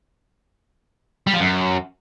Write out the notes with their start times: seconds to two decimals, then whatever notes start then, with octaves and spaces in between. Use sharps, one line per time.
1.27 G3
1.34 F3
1.40 F#2